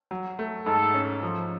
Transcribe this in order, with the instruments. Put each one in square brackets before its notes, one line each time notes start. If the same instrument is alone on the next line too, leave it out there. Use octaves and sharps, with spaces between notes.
[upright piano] F#3
A3
[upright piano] G#2 [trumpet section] A4
[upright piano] C#4
F3